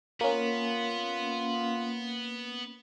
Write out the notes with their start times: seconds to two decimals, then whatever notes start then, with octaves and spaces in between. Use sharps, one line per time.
0.21 A#3 B3 C#4 F4